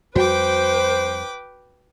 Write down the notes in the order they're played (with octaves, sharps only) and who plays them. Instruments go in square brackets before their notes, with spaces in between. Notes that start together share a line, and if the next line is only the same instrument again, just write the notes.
[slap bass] F2 G3 [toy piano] F#4 [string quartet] B4 G5 D6 [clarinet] C5